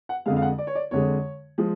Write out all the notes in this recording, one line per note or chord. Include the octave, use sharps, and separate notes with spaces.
F#5
F2 D3 G#3 F5
F5
F#5
D5
C#5
D5
F2 D3 G#3 C#5
F3 G#3